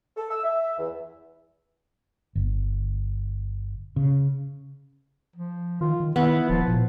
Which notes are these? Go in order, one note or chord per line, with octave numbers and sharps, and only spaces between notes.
A4
E6
E5
E2
G1
C#3
F3
D#3 F4
D#3
D#3 B3 E4
D#1 F3
A#2